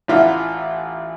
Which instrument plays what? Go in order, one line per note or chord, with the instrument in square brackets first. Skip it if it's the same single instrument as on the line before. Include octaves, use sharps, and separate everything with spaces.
[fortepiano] A1 E3 F4 E5 F#5